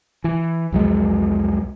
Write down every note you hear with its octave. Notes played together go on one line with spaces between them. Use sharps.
E3
C2 F2 F#3 G#3